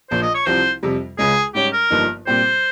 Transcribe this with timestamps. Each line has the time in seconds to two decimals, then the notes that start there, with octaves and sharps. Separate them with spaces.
0.10 A#1 A#2 F3 C5
0.22 D#5
0.35 C#5
0.46 C2 C3 F3 C4 C5
0.83 F2 C3 G3
1.18 C#2 C#3 G#3 G#4
1.55 G#2 G3 C#4 G4
1.73 A#4
1.90 G1 G2 F3 A#3 D#4
2.27 A#2 G3 C4 G4 C5